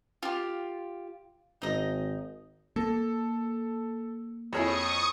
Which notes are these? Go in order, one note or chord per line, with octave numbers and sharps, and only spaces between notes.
F4 G4
G#1 D#4 D#5
A#3 A4
F2 E4 G#4 C#5 C#6 D#6 C#7